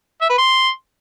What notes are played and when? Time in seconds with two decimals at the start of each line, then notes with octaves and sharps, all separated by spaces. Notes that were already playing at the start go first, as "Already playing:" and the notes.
0.21 E5
0.30 B4
0.38 C6